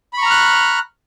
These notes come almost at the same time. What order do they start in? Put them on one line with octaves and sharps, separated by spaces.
B5 C#6 A#5 F6 F#6